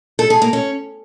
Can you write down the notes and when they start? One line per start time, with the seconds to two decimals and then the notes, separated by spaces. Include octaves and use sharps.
0.19 A4
0.30 G#4
0.42 A#3
0.53 C#4